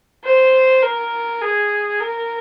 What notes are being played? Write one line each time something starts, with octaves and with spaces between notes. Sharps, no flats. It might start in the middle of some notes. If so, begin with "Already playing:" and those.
C5
A#4
G#4
A#4